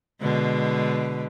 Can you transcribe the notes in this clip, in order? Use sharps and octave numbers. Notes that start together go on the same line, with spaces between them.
B2 D3 G#3